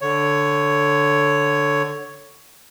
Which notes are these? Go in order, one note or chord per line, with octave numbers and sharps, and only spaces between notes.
D3 C#5